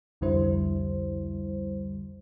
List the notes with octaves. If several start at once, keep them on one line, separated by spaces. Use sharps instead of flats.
C2 F2 D3 G3 E4 C5